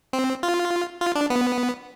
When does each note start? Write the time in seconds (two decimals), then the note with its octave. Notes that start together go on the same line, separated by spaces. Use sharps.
0.13 C4
0.43 F4
1.01 F4
1.15 D4
1.30 B3